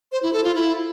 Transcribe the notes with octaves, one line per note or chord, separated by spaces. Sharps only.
C5
E4
A4
F4
E4